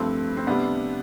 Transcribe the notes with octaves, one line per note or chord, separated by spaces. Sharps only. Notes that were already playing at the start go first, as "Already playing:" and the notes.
Already playing: G2 F3 A3 C4
C4
C3 G3 B3 D4